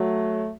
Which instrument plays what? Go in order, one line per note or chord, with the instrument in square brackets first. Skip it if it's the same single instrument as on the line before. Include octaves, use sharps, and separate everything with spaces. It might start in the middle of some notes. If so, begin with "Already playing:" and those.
Already playing: [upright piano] F#3 [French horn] A3